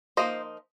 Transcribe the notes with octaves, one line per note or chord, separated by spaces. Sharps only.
F3 A#3 D#4 C5 D#5